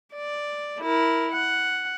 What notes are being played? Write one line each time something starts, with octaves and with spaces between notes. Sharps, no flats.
D5
E4 A#4
F#5